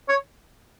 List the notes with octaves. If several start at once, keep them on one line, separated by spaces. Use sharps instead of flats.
C#5